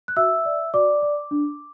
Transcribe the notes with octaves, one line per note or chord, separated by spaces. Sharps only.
F#6
F#4 E5 E6
D5
F#4 D5 D6
D5
D4